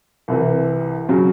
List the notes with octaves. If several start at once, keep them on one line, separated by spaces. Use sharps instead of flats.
C2 C3 E3
C#3 F#3